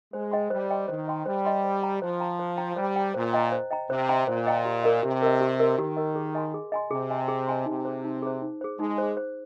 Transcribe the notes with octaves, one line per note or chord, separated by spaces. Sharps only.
G#3 C5
D#5 G5 C6
G3 C5
D#5 G5 C6
D#3 C5
D#5 G5 C6
G3 C5
D#5 G5 C6
C5
G5 A#5
F3 C5
G5 A#5
C5
G5 A#5
G3 C5
G5 A#5
A#2 C5
D#5 G5 A#5
C5
D#5 G5 A#5
C3 C5
D#5 G5 A#5
A#2 C5
D#5 G5 A#5
G4
A#4 D#5
C3 G4
A#4 D#5
G4
A#4 D#5
D#3 G4
A#4 D#5
G#4
D#5 G#5 C6
G#4
D#5 G#5 C6
C3 G#4
D#5 G#5 C6
G#4
D#5 G#5 C6
C3 D#4
G#4 C5
D#4
G#4 C5
D#4
G#4 C5
G#3 D#4
G#4 C5
C5